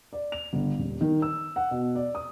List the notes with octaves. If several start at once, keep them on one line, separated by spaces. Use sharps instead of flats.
D5
F7
G1
D#1
D#3
E6
F#5
B2
D5
D#6